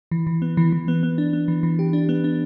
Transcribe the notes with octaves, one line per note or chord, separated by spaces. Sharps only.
E3
E3
B3
E3
E3
B3
B3
D4
B3
E3
E3
G4
D4
B3
D4